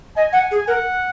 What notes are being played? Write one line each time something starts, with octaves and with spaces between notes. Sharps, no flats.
D#5 G#5
F#5
G#4
A#4 F#5